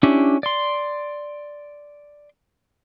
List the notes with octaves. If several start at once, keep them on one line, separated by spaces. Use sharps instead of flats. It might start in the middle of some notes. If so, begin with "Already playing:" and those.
C#4 D4 E4 G4
D5 C6